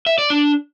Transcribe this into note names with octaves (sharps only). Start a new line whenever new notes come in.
E5
D5
D4